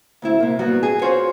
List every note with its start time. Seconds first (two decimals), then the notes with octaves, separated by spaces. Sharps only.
0.22 D2 C4 E4
0.40 C3 A#3
0.59 F#3 G3 B3 F#4
0.83 G#4
1.02 F4 F#4 C5 C#5